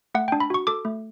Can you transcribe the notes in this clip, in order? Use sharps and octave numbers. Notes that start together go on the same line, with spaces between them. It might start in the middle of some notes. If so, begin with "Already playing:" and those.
A3 F#5
G5
D4
B5
F#4 C#6
A4 D6
A3